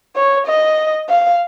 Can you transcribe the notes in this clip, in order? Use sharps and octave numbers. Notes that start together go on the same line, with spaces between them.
C#5
D#5
F5